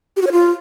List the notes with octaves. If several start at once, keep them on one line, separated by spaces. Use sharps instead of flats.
G4
F#4
C#5
F4